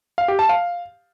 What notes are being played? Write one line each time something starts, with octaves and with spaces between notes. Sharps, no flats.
F5
G4
A5
F5